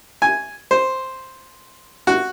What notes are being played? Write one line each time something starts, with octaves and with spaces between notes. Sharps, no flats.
G#5
C5
F#4